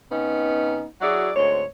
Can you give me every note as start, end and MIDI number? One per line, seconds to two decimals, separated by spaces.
0.11 0.84 48
0.11 0.84 59
0.11 0.84 61
0.11 0.84 63
1.01 1.30 54
1.01 1.30 64
1.01 1.30 66
1.01 1.30 68
1.01 1.30 74
1.36 1.64 38
1.36 1.64 44
1.36 1.64 60
1.36 1.64 73